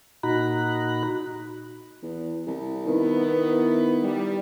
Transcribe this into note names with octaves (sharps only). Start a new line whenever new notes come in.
A#2 D#4 F#4 A#5 B5 F#6
E2
C2
D#3 B3 E4
G3